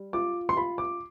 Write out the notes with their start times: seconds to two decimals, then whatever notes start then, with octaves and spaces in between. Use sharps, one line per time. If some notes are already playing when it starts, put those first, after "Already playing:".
Already playing: G3
0.13 F4 D6
0.49 C6
0.56 F4 B5
0.78 D6